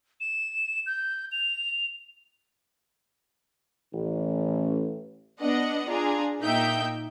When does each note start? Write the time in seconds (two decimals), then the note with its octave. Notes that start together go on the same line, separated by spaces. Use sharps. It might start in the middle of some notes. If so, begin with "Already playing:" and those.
0.20 E7
0.86 G6
1.32 F7
3.93 A1
5.41 B3 D4 D#5 F#5
5.88 D4 F4 G#4 A#5
6.42 A#2 A#3 D#4 E5 G5 G6